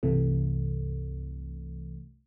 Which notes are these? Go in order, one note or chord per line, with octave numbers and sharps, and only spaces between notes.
C2 G2 C3 E3 A3